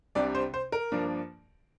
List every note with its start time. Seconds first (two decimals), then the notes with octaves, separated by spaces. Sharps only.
0.15 C2 C3 G3 D4 D5
0.35 C5
0.54 C5
0.72 A#4
0.92 G2 F3 A#3 D4